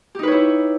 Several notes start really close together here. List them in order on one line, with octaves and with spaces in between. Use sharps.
G4 D#4 B4 C#5 E4